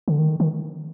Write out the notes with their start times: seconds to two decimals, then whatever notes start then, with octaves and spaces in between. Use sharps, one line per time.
0.08 D3
0.19 D#3
0.40 D#3